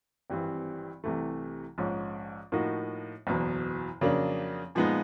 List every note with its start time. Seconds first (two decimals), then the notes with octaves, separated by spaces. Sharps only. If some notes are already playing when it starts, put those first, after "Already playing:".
0.30 G#1 G2 E3 G3 C4
1.04 C2 C3 E3 A3
1.78 A#1 G#2 F3 G#3 C#4
2.52 A2 F3 A#3 D#4 F#4
3.27 F#1 E2 B2
4.01 F2 C#3 F#3 A#3 D4
4.75 A#2 F3 G#3 B3 D#4